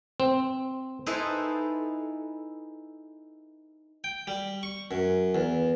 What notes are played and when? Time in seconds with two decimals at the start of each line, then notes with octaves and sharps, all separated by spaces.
0.20 C4
1.06 D#4 E4 G#4 A4 B4 C5
4.04 G5
4.27 G3
4.63 C#6
4.91 F#2
5.35 E2